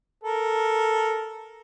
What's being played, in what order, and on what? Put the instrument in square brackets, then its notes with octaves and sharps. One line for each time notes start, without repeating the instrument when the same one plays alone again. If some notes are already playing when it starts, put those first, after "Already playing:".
[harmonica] A4 A#4